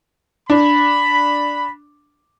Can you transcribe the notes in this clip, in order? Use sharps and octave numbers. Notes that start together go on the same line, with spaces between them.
D4 B5